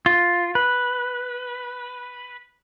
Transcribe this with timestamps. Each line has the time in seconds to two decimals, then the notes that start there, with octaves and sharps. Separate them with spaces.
0.06 F4
0.55 B4